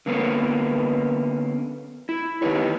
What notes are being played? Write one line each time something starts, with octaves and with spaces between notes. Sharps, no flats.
D3 A#3 B3 C#4
E4
D#3 G#3 D#4 G4 B4 C#5